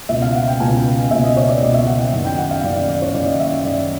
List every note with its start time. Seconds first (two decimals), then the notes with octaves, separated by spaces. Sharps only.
0.09 C#2 E5
0.12 B2
0.22 F5
0.35 F#5
0.48 G5
0.60 C#2 B2 G#5
1.11 C#2 B2 E5
1.24 D#5
1.37 C#5
1.49 D5
1.62 C#2 B2 D#5
1.74 E5
1.87 F#5
1.99 G5
2.13 F#2 D#3
2.25 G5
2.38 F#5
2.51 F5
2.64 F#2 D#3 D5
2.76 D5
2.89 D5
3.02 C#5
3.14 F#2 D#3 D5
3.26 D#5
3.40 E5
3.64 F#2 D#3 D5